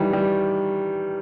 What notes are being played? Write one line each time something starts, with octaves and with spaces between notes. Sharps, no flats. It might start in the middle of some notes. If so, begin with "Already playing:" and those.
Already playing: D#3 E3 G3
G3